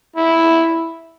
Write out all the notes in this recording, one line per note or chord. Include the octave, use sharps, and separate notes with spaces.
E4